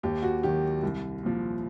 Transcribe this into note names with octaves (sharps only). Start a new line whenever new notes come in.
D#2 G4
F#4
D#3 F#3 G4
C2
A#2 F3